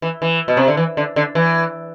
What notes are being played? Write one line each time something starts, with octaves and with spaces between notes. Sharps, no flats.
E3
E3
B2
C3
D3
E3
D3
D3
E3